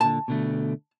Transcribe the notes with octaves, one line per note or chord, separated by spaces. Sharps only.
A#2 D3 A5
B2 D3 A3